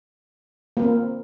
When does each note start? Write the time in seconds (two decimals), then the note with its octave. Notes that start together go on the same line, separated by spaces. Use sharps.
0.77 A#3
0.80 A#4
0.82 C4